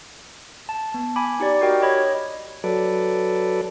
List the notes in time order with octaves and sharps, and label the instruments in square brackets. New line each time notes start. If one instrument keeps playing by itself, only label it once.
[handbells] A5
B3
G#5 B5 D6
D#4 G4 D5
F#4 G4 A#4 D#5 G5
C#5 D#5 B5 G#6
[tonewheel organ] F#3 A4 B4 D5